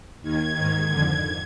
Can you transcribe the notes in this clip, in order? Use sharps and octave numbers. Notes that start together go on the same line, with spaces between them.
D#2 D#3 G#6
G#2 D#3
F2 D3